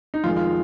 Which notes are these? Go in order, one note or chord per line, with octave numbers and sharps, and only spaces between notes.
D#4
F2 D#3 G#3 F4
F4